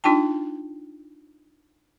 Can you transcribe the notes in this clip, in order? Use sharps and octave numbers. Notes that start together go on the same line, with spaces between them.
D4 D#4 F4 G5 A5